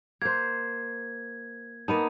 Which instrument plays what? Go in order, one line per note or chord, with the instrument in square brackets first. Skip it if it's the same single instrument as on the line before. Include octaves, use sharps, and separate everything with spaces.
[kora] A#3 C5 [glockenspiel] G#6
[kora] A#3 B3 D#4 [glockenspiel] A5 D#7